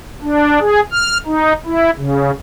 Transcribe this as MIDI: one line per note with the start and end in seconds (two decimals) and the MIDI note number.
0.22 0.59 62
0.60 0.80 68
0.92 1.17 89
1.26 1.53 63
1.66 1.90 64
1.97 2.31 49